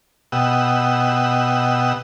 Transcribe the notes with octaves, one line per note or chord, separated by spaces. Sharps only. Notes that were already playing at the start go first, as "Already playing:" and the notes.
B2 G4 D#5 F#5 E6